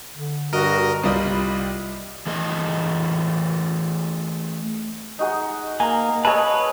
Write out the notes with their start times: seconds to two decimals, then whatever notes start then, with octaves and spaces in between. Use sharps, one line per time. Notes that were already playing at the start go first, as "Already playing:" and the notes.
0.14 D3
0.53 G2 F#4 A#4 D#5
1.03 C2 G3 F4 D5 D#5 B5
2.26 E3 A3 G#4 D#5
5.19 D#4 F#4 G#4
5.80 A#3 G#5 A#5
6.25 G#4 B4 C#5 D#5 E5 G#5 A5